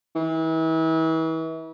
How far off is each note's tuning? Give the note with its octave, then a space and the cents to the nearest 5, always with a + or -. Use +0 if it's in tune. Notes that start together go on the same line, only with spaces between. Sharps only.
E3 -35